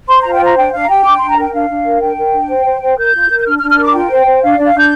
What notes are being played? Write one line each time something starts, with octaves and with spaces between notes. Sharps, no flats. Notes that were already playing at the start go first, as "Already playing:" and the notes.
C5 C6
F4 A#5
G5
C5 A#5
D4 G5
D4 F5
A#5
G4 G5
D4 D6
D4 C6
A#5
A#4 G5
D4 F5
D4
A#4
D4 G5
A#4
D4
C5
C5
C5
A#4 G6
F4
A#4
G6
D4 F6
F6
D4
F6
A#4 D6
F4 G5
C5
C5
D4 F5
D4 D5
F5
D4 G6